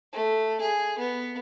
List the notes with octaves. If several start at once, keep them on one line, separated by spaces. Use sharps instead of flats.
A3
G#4
B3